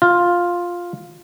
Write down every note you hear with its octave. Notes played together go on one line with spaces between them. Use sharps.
F4